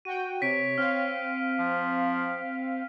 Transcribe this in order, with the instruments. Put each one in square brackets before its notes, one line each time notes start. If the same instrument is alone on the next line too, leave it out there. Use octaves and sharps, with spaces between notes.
[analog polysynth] F#4 G5 [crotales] D#7
[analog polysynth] C3 [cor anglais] C#5 [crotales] B6 D7
[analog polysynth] C4 F5 [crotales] F6
[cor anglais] F3